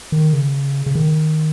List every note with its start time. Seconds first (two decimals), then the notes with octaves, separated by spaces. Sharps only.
0.12 D#3
0.33 C#3
0.86 C#3
0.95 D#3